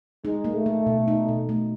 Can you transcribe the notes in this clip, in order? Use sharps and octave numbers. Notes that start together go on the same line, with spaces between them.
G#3 D#4
A#3
A3
A#3
B2
D#4
B2
A3